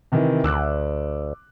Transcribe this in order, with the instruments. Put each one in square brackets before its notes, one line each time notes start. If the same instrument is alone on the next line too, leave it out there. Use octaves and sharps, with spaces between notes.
[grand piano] C3 D#3 E3
[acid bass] D2 [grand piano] D6 E6 F#6